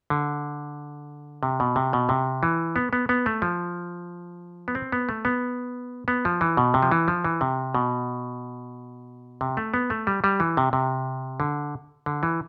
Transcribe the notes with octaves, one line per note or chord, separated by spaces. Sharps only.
D3
C3
B2
C3
B2
C3
E3
B3
B3
B3
A3
F3
B3
C4
B3
A3
B3
B3
F3
E3
B2
C3
F3
E3
F3
E3
C3
B2
C3
A3
B3
A3
G3
G3
E3
C3
C3
D3
D3
E3